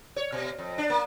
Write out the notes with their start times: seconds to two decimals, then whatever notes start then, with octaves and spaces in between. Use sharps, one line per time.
0.16 C#5
0.32 B2
0.58 F2
0.78 D4
0.90 A#3